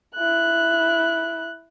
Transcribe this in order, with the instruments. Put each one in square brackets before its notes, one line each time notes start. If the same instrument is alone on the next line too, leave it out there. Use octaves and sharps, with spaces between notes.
[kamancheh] E4 F#6